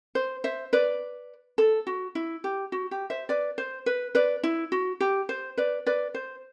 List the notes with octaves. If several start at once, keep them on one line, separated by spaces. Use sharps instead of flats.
C5
C5 E5
B4 D5
A4
F#4
E4
G4
F#4
G4
C5 E5
B4 D5
C5
B4
B4 D5
E4
F#4
G4
C5
B4 D5
B4 D5
C5